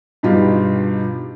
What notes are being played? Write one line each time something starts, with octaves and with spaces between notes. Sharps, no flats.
G2 B2 D#4 F4 G4